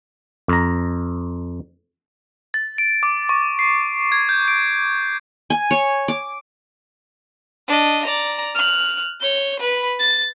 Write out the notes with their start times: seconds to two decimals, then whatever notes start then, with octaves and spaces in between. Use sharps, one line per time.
0.48 F2 A#5
2.54 A6
2.78 D7
3.03 D6
3.29 C#6
3.59 C7
4.12 G#6
4.29 G6
4.48 D7
5.50 G#5
5.71 C#5
6.08 D6
7.67 D4 D#5
8.05 D5 A#5
8.55 F6 F#6
9.21 C#5 G6
9.60 B4 B5
9.99 A6